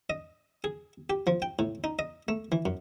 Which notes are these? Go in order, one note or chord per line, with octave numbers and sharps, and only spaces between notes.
D#5
G#4
G4
F3
G5
A2
D#4
D#5
A3
E3
F#2